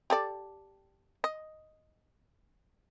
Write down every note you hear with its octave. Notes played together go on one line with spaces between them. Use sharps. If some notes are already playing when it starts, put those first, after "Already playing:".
G4 A4 D5
D#5